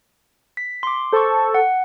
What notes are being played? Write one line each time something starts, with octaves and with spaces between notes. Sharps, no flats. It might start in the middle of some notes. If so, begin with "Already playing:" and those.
B6
C6 D6
A4 C5 C#6
F#5